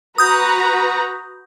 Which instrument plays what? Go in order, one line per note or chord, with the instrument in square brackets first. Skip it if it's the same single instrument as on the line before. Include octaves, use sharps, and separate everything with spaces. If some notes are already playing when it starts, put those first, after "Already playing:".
[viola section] F#4 B4 A#5 [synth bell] D#6 G6